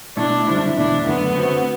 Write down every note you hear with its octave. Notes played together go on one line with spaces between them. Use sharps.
B2 A3 D4 E4 A4
F#2 D3 G3 C4 E4
E2 B2 A3 D4 E4
F#2 D3 A3 B3
D3 A3 C4 F#4